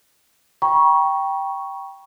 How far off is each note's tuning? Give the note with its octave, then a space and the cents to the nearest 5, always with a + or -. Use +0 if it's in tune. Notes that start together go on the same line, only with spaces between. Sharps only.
G5 -5 A#5 +45 C#6 +0